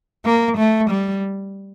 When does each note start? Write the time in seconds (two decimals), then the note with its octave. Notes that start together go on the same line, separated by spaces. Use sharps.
0.26 A#3
0.58 A3
0.91 G3